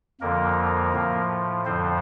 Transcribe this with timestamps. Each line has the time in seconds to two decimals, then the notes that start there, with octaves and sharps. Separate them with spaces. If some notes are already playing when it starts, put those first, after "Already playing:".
0.21 F2 D3 F3 A#3 A#4
0.93 A2 F3
1.65 F2 D3 F3 C4 C5